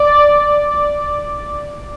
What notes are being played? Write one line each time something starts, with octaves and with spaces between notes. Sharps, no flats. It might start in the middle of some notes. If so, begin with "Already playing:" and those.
Already playing: D5